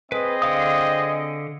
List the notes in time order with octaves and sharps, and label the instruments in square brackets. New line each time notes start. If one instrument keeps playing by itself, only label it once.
[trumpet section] C4 G#4 D#5 [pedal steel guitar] B4
[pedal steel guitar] D3 F5 D#6